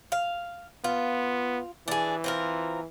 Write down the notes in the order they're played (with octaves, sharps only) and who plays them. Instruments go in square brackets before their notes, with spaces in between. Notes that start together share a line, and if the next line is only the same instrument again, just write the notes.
[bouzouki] F5
[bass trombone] B3 [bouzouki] F4
[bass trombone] E3 [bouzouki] D4 G#4
[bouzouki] C4 F4 A#4